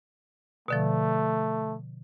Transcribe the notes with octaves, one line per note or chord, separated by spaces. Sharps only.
B2 D3 F3 A3